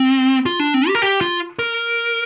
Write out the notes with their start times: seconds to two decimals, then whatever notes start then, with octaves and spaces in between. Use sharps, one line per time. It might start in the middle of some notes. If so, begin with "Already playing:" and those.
Already playing: C4
0.46 F4
0.60 D4
0.74 C4
0.88 G4
0.95 A#4
1.02 G4
1.21 F4
1.59 A#4